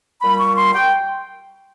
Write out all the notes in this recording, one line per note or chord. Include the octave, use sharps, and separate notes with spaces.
A#2 G3 B5
C#6
C6
G5